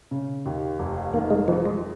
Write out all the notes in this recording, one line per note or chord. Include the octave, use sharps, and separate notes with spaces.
C#3
D#2
F1
D#3 A#3
G#3
F2 F3
G#3